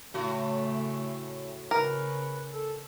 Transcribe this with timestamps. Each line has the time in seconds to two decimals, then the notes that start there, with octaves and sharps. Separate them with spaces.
0.14 A2 C#3 A3 F#4
1.71 C#3 A#4 B4
2.53 A4